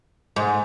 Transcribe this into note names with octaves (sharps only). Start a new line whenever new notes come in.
G#2